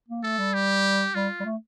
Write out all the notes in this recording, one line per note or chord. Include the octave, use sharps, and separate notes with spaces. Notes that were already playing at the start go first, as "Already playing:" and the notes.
A#3
A3 A4
G3
G4
G3 F4
G3
A3